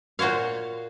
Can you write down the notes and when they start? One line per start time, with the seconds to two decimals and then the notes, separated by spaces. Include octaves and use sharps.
0.19 A#2 F#4 C5 C#5 F5